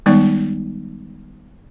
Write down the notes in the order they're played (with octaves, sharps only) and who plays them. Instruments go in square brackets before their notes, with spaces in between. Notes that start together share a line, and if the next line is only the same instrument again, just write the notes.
[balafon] D#3 G3 G#3 B3 D#4 D5